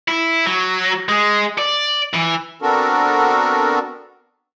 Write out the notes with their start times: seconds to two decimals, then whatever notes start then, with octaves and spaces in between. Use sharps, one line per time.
0.08 E4
0.46 F#3
1.09 G#3
1.58 D5
2.15 E3
2.62 B3 C4 D4 F#4 A4 A#4